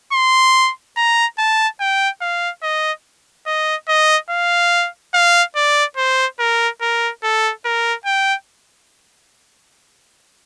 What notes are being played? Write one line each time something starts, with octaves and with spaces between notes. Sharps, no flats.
C6
A#5
A5
G5
F5
D#5
D#5
D#5
F5
F5
D5
C5
A#4
A#4
A4
A#4
G5